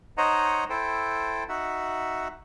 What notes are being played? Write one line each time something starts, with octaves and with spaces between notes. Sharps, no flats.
D#4 C5 C#5 D#5 F#5 A#5
E4 A4 C5 G5
D#4 F#4 E5 F#5